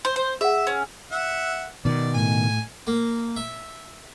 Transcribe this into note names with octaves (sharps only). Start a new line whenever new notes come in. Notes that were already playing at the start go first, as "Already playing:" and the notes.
C5
C5
G#4 E5 F#5
C#4
E5 F#5
B2 D#3 D5
A2 G#5
A#3
E5